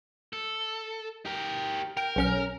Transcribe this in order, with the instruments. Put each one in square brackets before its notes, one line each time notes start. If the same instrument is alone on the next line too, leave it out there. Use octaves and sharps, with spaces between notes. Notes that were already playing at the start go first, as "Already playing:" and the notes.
[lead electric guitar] A4
G4 A#4
[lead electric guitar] A#4 [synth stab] G5
[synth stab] B1 C#4 F6